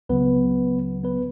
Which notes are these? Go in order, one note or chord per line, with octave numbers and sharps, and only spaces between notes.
C#2 C#3 F#3 B3 B4
B3 B4